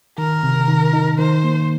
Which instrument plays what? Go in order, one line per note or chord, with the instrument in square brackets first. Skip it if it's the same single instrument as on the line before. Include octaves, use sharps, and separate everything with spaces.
[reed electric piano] D#3 [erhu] A#4
[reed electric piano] C3
D#3
D#4
[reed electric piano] D#3 [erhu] C5
[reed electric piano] A#3